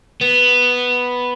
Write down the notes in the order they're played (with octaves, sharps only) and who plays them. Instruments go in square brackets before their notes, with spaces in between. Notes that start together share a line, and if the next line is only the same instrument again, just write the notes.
[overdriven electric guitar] B3